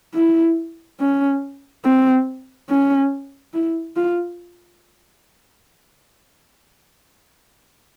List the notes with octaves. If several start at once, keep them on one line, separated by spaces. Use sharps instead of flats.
E4
C#4
C4
C#4
E4
F4